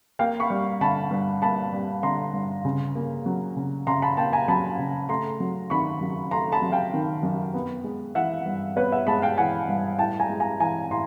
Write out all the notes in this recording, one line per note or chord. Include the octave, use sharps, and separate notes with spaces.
A#3 F5 G5
B5 C#6
G3
D3 A5 B5
G2
A#3 A5 B5
G3
D3 A#5 C6
G2
C#3
A#3
F#3
C#3
C#3 A#5 C6
A5 B5
A#3 G5 A5
G#5 A#5
F#3 A5 B5
C#3
A3 A#5 C6
F#3
D#3 B5 C#6
F#2
A3 A#5 C6
A5 B5
F#3
F5 G5
D#3
F#2
B3
G#3
E3 E5 F#5
G2
B3 B4 C#5
E5 F#5
G#3 A5 B5
F5 G5
E3 F#5 G#5
G2
A2 G5 A5
G#5 A#5
G#3
G#5 A#5
E3 G#5 A#5
A2 A#5 C6